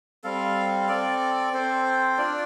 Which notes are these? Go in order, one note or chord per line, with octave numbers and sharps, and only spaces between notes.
G3 C4 A4 F5
C4 A4 D5
C4 A4 C5
D4 F4 D5